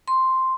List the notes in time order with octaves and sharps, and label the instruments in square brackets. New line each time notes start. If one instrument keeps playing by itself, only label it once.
[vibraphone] C6